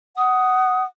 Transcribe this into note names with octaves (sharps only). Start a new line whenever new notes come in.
F#5 D#6